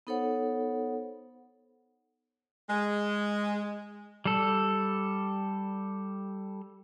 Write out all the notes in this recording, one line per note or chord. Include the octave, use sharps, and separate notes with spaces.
B3 D#4 A4 C5 C#5 F#5
G#3
G3 A4